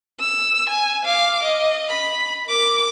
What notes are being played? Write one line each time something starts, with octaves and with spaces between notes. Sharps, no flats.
E6
G#5
F5 D6
D#5
B5
A#4 D6